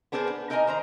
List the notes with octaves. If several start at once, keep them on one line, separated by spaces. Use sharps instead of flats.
B3 D4 G#4 A#4 C5
B3
D#4 A#4 D#5 G5 G#5 A#5
D#3 C5 A#5